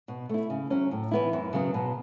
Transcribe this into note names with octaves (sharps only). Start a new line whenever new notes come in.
B2
A3 E4
C#3
F#3 C#4
A2
E3 B3 E4
F#2
C#3 F#3 B3
B2